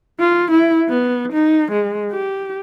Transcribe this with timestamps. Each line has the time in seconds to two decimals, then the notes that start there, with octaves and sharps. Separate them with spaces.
0.20 F4
0.51 E4
0.89 B3
1.33 D#4
1.72 G#3
2.12 G4